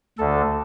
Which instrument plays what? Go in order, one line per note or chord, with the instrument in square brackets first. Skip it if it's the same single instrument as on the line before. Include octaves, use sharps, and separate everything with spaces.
[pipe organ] D2 D3 A4